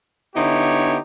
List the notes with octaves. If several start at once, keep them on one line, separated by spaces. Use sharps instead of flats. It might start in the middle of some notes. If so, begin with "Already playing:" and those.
D3 B3 D#4 E4 G4 C#5